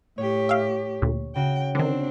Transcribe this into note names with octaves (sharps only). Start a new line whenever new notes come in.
A2 G4 C#5
E5 F5
D2 A#2
C#3 F#4 G5
D3 D#3 C4 D4